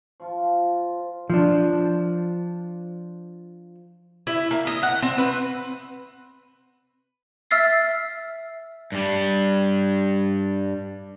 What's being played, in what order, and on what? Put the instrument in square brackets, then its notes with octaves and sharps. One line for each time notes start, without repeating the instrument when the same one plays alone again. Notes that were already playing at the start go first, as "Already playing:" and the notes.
[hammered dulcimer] F3 F4
[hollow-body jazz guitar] F3 D4
[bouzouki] E4
A#3
D#5
F#5
C4
B4
[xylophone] E5 E6 F6 A6 C7
[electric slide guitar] G2 G3